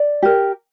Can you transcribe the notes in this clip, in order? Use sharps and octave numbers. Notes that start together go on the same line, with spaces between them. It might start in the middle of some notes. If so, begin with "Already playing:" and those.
Already playing: D5
G4 A#4